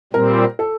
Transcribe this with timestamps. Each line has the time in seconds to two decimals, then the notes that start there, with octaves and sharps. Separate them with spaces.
0.13 A#2 G3 C4 A#4
0.59 A4